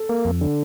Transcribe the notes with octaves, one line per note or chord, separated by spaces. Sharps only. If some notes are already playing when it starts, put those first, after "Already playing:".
Already playing: A4
A#3
F2
D3